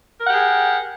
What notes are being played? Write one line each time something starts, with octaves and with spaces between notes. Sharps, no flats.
G4 G#4 A#4 F#5